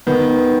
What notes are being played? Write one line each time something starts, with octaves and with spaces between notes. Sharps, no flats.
D#3 B3